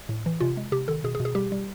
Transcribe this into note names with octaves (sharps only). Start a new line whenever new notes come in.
A2
E3
C3 F4
G#3
C3 G4
D#3 A4
B2 G#4
G#4
B2
G#4
G3 G4
G3